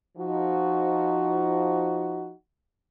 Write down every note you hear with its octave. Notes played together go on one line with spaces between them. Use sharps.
F3 D#4 F#4